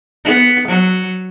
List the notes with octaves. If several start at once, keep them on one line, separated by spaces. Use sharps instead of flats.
B3
F#3